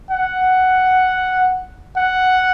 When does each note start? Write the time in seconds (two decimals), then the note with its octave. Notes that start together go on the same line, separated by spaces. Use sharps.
0.10 F#5
1.97 F#5